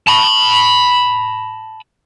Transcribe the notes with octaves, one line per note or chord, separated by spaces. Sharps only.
A5 B5